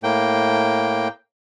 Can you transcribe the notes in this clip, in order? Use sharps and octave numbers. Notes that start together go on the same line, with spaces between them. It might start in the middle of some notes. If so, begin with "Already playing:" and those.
A2 A#3 G5